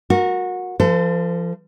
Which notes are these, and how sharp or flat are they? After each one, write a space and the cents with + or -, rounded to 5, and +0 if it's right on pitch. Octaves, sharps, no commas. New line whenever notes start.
F#4 -20 A#4 +0
F3 -25 A4 +30 C5 -40